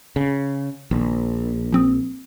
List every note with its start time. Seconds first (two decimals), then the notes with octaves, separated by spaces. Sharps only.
0.16 C#3
0.91 A#1 D#3
1.73 F3 C4 D#6